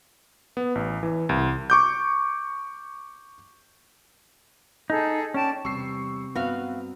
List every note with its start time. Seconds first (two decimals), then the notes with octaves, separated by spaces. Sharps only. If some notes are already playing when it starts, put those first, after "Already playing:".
0.57 B3
0.75 A1
1.03 E3
1.29 C2
1.70 C#6 D6 G6
4.90 D#4 G#4 A4
5.34 C#4 D5 G5 A5
5.65 E2 C3 G3 C#6 E6 C7
6.35 G2 F#3 B3 C4 F#4 B4 F5